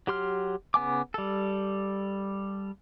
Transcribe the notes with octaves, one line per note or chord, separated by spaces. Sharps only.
F#3 G4 C6 F6
C#3 B3 G#5 D6
G3 A4